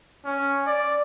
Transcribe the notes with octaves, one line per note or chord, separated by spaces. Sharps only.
C#4
D5